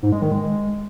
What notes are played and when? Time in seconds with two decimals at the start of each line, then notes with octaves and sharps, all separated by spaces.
0.02 G#2
0.12 G#3
0.22 D#3
0.32 G#3